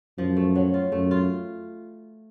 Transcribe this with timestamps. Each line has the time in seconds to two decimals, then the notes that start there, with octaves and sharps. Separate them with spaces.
0.18 F#2 F3
0.36 A3
0.56 F#3
0.74 F4
0.92 F#2 A3
1.11 F4